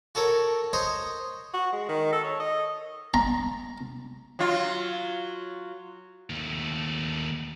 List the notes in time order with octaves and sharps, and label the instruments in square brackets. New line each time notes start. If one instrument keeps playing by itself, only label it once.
[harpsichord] F#4 A4 A#4 C#5
C5 C#5 D#5 A#5
[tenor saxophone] F#4
G#3
D#3
A4
C#5
D#5
[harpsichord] A#5
[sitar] F#3 F4
[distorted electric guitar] D#2 A3